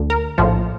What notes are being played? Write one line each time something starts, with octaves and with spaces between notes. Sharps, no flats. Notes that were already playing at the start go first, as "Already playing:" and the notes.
Already playing: D2 D3
A#4
A#1 A2 F3